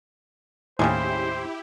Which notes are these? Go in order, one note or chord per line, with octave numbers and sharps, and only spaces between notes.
D#2 A2 C#3 G3 G#3 E4 G4 C5